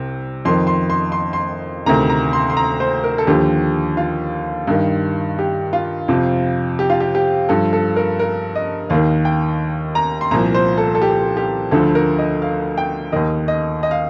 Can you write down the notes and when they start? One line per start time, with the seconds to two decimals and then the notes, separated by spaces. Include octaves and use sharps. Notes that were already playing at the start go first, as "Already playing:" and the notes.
Already playing: C2 C3
0.45 F2 D#3 C6
0.67 C6
0.90 C6
1.12 C6
1.33 C6
1.86 D2 C3 D#3 A#5
2.09 A#5
2.33 C6
2.50 C6
2.57 A#5
2.80 C5
3.04 A#4
3.18 A4
3.27 D#2 D3 F3 G4
3.97 F4
4.67 G2 D#3
5.39 G4
5.73 F4
6.08 F2 C3 F3
6.79 G4
6.90 F4
7.00 G4
7.15 G4
7.49 G2 F3 A4
7.73 A4
7.96 A#4
8.19 A#4
8.55 D#5
8.90 D#2 D#3 F5
9.25 G5
9.95 A#5
10.21 C6
10.31 C2 A#2 F3 A#5
10.55 C5
10.78 A4
10.95 A4
11.02 G4
11.37 G4
11.71 D2 D3 F3 A4
11.95 A#4
12.19 D#5
12.42 F5
12.78 G5
13.12 D#2 D#3 D#5
13.48 D#5
13.83 D#5
13.91 F5